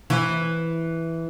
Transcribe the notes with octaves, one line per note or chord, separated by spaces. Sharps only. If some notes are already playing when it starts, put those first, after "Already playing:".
E3